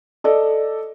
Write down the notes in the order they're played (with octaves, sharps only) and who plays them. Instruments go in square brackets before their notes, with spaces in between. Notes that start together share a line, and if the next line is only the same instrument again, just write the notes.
[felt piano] A4 D5 D#5